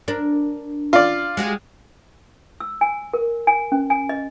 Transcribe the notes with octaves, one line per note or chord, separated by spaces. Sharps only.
D4 A#4
F4 D5
G#3 F#4 G4
E6
G#5
A#4
G#5
C#4
G#5
D#5